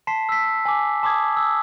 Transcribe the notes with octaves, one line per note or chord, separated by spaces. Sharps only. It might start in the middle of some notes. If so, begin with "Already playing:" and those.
A5 C6 B6 C7
E6 B6
B6
G#5 D6
A5 C6 D6 D#6 G#6
E6